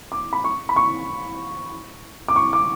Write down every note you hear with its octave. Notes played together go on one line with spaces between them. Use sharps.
D6
B5
C#6
B5
C#6
D6
C#6
D6